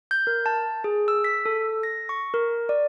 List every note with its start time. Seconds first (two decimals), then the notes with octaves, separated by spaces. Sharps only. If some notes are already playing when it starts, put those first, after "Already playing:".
0.11 G6
0.27 A#4
0.46 A5
0.84 G#4
1.08 E6
1.24 B6
1.46 A4
1.83 A#6
2.09 C#6
2.34 A#4
2.69 D5